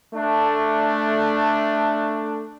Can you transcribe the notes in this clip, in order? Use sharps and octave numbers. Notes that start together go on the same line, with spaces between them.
A3 D4